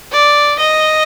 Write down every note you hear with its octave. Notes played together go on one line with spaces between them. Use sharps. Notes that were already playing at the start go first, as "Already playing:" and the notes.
D5
D#5